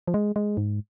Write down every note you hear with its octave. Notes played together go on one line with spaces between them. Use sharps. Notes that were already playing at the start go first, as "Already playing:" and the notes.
F3
G#3
G#3
G#2